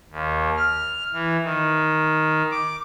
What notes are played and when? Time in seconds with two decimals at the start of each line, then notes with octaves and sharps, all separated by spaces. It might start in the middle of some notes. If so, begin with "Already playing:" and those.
0.10 D#2
0.57 F6
1.12 E3
1.44 D#3
2.51 D6